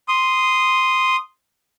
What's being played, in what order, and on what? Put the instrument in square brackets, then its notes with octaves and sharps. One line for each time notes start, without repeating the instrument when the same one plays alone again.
[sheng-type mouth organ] C6 D#6